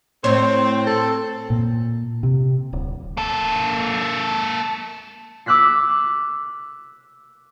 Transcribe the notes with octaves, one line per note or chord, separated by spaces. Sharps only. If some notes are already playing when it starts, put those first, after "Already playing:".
A2 C4 C5 C#5
A4
A#2
C3
D1
A#3 A4
D6 E6 F#6 B6 C7